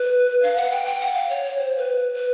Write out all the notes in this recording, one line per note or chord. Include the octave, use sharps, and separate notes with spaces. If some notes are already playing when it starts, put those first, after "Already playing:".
Already playing: B4
F5
F#5
G5
G5
F#5
F5
C#5
C#5
C5
B4
B4